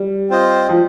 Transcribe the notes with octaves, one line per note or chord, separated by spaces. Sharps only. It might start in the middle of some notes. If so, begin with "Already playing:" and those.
Already playing: G3
C4 F4 C5 D#5
F3